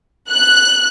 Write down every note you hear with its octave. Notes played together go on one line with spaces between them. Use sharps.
F#6